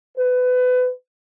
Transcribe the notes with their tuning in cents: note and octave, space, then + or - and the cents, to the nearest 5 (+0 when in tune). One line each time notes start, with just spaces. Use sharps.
B4 +25